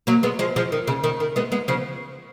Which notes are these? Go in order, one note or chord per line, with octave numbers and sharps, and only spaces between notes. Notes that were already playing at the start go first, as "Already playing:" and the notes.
F#3 A#3
G#3 B3
F3 G#3
F3 G#3
D#3
C#3
D#3
D#3
G#3 B3
G#3 B3
C#3 F3